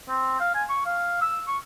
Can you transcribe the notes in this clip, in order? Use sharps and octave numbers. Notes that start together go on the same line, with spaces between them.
C4
F5
G#5
C#6
F5
E6
C#6